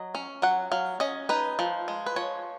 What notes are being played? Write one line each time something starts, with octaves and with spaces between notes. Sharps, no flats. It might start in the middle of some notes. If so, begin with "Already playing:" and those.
Already playing: F#3 D#5
C#4
F#3 F#5
F#3 F5
C#4 D#5
D#4 B4
F3
G#3
B4
F3 C#5